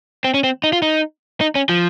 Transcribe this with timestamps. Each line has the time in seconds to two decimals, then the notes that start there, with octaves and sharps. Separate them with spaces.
0.24 C4
0.34 C#4
0.44 C4
0.64 D#4
0.73 F4
0.82 D#4
1.41 D#4
1.55 C#4
1.69 F3